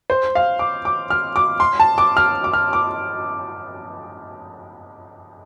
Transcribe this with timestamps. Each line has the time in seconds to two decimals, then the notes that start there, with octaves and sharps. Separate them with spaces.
0.10 C5
0.35 F5
0.59 D6
0.85 D6
1.10 F6
1.36 D6
1.60 C6
1.80 A5
1.98 D6
2.17 F6
2.44 D6
2.53 F6
2.73 D6